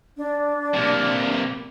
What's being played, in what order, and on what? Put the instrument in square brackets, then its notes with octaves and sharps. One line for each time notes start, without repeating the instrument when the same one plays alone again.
[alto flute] D4
[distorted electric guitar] C3 A#3